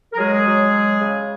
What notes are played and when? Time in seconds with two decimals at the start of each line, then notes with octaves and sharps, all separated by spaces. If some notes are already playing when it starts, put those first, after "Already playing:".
0.13 A#4
0.18 F#3 G#3 G#4
0.46 F#3
0.73 F#3
1.01 C#3